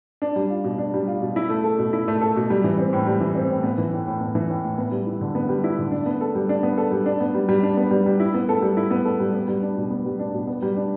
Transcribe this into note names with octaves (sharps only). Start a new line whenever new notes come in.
D4
G3
F4
B2
D4
G3
F4
B2
E4
A3
A4
B2
E4
A3
A4
B2
G3
E3
C4
A2
G3
E3
C4
A2
B3
E3
A2
A2
B3
E3
A2
A2
B3
G3
E4
D3
B3
G3
E4
D3
D4
B3
A4
G3
D4
B3
A4
G3
D4
B3
G3
G3
D4
B3
G3
G3
E4
B3
A4
G3
E4
B3
A4
G3
B3
G3
D4
B2
B3
G3
D4
B2
B3
G3
D4